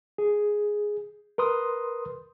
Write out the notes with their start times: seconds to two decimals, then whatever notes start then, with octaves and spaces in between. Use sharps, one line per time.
0.18 G#4
1.38 A#4 B4 C6 D#6